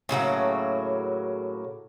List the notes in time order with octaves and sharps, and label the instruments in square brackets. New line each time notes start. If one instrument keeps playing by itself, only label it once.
[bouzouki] A2 C#3 F#3 A#3